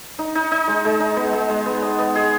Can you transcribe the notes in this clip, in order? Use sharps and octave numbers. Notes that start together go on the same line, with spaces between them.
D#4
D#4
D#4
G#3
G#3
D#4
B3
G#3
G#3
B3
D#5
B3
G#4